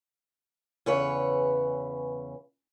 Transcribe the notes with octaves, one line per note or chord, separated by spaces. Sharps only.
E2 C#3 B4 C#5